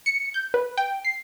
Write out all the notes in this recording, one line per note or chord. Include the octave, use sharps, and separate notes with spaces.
C#7
G6
B4
G5
C7